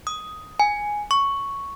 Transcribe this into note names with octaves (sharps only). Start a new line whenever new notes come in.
D#6
G#5
C#6